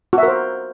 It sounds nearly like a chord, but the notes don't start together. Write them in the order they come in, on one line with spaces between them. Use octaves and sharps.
F#4 E5 A#4 C5